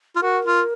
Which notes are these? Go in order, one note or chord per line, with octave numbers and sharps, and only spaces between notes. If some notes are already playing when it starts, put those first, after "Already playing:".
F4
F#4 A#4
F4